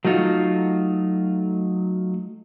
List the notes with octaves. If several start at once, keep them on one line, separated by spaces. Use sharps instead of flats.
F#3 A3 D#4 F4 F#4